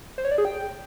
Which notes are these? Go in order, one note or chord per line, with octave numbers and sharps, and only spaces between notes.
C5
C#5
D5
G#4
G5